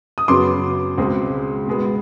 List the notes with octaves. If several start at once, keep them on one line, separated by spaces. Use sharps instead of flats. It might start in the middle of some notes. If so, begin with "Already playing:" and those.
D#6
F#2 C#3 F#3 B3 C6 D6
C#2 B2 G#3 C4
B2 G#3 B3